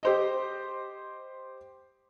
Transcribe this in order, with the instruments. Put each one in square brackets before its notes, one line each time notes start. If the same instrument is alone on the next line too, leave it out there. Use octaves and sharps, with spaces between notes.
[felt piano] G4 C5 D#5